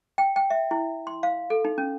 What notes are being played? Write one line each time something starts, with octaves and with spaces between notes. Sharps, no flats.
G5
G5
E5
E4
C6
F5
A4
D#4
C#4